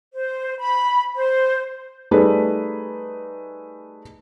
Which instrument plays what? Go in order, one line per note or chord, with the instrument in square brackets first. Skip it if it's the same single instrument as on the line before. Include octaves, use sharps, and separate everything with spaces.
[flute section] C5
B5
C5
[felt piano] G3 A3 D#4 G#4 B4